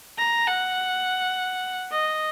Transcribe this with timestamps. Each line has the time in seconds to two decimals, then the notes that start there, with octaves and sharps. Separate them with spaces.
0.18 A#5
0.47 F#5
1.91 D#5